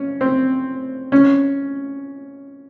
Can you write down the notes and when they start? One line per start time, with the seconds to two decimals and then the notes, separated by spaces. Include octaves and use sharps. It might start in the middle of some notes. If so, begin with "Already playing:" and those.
Already playing: C#4
0.21 C4
1.12 C#4